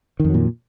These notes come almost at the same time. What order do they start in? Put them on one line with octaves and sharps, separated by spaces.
D#3 F2 F#3 A#2